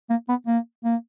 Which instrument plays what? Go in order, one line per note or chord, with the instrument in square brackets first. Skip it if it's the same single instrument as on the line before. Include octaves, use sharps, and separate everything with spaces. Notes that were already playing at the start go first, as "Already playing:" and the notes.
[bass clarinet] A#3
B3
A#3
A#3